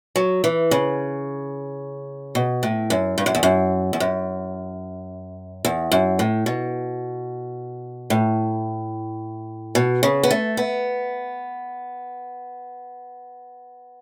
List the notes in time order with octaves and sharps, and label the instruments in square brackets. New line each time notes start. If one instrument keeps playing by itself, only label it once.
[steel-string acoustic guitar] F#3
E3
C#3
B2
A2
F#2
G2
F#2
E2
F#2
E2
F#2
E2
F#2
A2
B2
A2
B2
C#3
B3
A3
B3